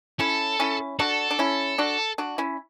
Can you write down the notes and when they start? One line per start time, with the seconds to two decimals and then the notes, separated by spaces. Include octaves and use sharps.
0.20 C#4 E4 A4
0.60 C#4 E4
1.00 D4 F#4 A4
1.31 D4
1.39 C#4 E4
1.78 D4 F#4
2.18 D4 F#4
2.38 C#4 E4